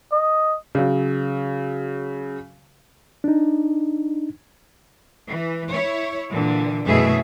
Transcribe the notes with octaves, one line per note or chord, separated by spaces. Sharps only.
D#5
C#3 F#3
D4 D#4
E3
E4 C#5
A#2 D3 E3
F#2 B2 E3 A3 G#4 E5